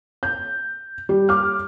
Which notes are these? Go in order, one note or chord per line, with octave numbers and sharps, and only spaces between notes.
G6
G3
D6 F6